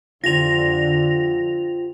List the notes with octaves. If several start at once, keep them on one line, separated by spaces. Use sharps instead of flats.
F2 D3 F4 G4 C5 A#6 F7